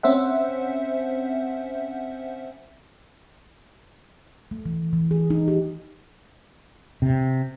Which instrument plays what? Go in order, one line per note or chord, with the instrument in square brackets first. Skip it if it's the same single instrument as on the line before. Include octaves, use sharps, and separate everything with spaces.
[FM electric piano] C4 C#4 C5 E5 F#5
[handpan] A3
E3
E3
G#4
D#4
G4
[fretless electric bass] C3